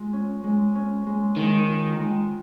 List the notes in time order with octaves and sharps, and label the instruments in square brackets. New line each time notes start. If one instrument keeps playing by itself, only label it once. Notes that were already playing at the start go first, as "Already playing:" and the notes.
Already playing: [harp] G#3 F4
C#4
G#3
C#4
G#3
[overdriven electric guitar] D#3 [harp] G#3
[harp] F4
G#3